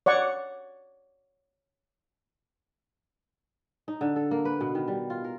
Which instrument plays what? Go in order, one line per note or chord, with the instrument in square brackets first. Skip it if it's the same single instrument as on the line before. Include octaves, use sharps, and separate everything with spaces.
[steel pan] C#5 D5 F#5 C#6
[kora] D#4
D3
A4
A#3
B4
B2
D#3
G3
F4
A#4